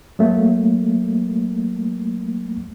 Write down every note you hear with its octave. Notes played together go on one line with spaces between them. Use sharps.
F#3 A3 A#3